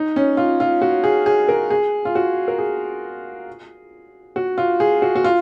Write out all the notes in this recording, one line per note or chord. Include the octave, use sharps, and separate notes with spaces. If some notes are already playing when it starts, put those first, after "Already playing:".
Already playing: D#4
C#4
F4
F4
F#4
G#4
G#4
A#4
G#4
F4
F#4
A#4
G#4
F#4
F4
G#4
F#4
F#4
F4